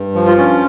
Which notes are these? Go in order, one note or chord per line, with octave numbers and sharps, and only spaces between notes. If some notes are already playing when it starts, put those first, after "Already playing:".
Already playing: G2
F3
F4
C#4